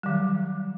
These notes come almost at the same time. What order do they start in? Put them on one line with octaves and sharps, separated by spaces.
G3 D#3 F#3